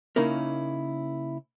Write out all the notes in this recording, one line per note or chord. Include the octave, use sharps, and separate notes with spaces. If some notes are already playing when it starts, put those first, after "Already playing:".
C#3 A#3 C#4 D#4 E4 A#4